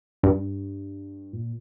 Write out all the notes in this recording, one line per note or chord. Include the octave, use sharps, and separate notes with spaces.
G2
A#2